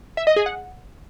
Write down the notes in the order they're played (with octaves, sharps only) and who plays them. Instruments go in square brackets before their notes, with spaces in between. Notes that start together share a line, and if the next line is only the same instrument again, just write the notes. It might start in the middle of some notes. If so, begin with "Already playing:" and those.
[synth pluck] E5
D#5
G#4
F#5